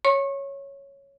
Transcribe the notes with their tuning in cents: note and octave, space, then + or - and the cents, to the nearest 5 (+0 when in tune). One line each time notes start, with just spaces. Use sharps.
C#5 +0 C#6 -30